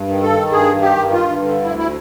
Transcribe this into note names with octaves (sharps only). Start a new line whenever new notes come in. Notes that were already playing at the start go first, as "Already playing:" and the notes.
Already playing: G2
D#3
A4
D#3
G2 G#4
D#3
G4
G2
F4
G2
D3
D2 E4
E4